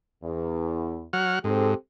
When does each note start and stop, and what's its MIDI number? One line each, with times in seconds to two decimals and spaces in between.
0.23 1.03 40
1.13 1.39 54
1.13 1.39 78
1.13 1.39 89
1.44 1.75 44
1.44 1.72 60
1.44 1.72 67
1.44 1.72 69